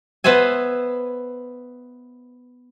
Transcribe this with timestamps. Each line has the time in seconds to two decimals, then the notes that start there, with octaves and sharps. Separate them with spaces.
0.24 B3 B4 C5 E5 G#5